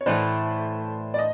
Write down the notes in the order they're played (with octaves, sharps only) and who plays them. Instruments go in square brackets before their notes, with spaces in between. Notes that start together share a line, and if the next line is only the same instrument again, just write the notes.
[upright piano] C#5
[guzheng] A2 E3 A3 [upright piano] C5 D5
[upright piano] D5
D#5